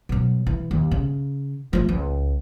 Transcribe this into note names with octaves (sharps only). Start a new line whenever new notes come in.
B2 F#3
E3
D#2
C#3
F3 A3
C#2